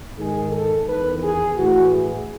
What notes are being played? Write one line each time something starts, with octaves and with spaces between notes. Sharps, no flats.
G#2 D#3 G#4
A4
E2 D#3 B4
G#4
A2 E3 F#4
G#4